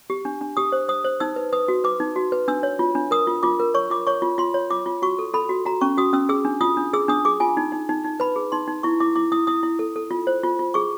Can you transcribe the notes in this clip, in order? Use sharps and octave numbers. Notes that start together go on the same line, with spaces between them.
G4
D4
D4
G4 D#6
C5
C5 D#6
C5
D#4 E6
B4
B4 D#6
F#4
B4 D6
D#4
F#4
B4
D4 E6
C#5
F4
D4
A#4 D#6
F4
F4 D6
A#4
C#5 C#6
F4 D6
C#5 C#6
F4
F4 C6
C#5
F4 D6
F4
F#4 C#6
A4
A4 B5
F#4
F#4 A#5
C#4 C#6
F#4 D#6
C#4 E6
G#4 E6
D4
F4 D#6
D4
G#4 E6
D4 D#6
G#4 D6
F4 G#5
D#4
D#4
D#4
D#4
B4 B5
G#4
D#4 C6
D#4
E4 C#6
E4 D6
E4 D6
E4 D#6
E4 D#6
E4
A4
A4
F4
C5
F4
F4
G#4 C#6